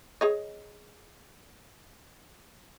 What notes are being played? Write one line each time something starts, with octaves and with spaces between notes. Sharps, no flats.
G#4 C#5 D#5